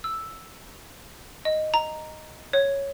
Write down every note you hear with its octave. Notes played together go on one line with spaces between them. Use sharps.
E6
D#5
A#5
C#5